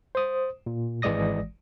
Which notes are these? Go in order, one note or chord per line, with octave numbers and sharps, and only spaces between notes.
C5 D#6
A#2
G#1 E3 G#3 D5 D#6 A#6